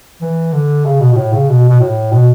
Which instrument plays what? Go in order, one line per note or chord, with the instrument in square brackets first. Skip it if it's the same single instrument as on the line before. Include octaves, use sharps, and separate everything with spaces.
[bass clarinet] E3
D3
C#3
B2
B2
A2
C#3
B2
B2
A2
B2